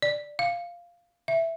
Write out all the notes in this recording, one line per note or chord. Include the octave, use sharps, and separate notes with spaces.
D5
F5
E5